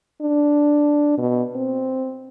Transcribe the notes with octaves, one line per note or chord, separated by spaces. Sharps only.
D4
B2
C4